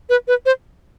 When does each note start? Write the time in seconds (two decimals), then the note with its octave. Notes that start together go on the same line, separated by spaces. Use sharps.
0.10 B4
0.28 B4
0.46 C5